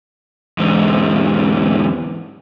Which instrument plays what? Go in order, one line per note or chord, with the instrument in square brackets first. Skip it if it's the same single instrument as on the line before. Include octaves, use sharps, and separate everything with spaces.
[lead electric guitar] E2 G#2